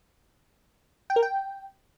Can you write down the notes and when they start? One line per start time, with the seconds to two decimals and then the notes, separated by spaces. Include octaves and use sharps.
1.10 G5
1.16 A#4
1.22 G5